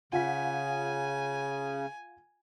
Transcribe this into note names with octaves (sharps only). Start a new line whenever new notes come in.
C#3 F4 F#5 G#5 B6